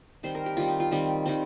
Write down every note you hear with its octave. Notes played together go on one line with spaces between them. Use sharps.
D#3 G3 C4 C5
A#4
G4
D#3 G3 C4 F4
D#4
F4
D#3 G3 C4
D#3 G3 C4